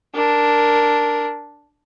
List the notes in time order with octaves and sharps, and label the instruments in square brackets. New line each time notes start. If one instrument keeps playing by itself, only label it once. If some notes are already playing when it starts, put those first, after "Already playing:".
[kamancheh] D4 A#4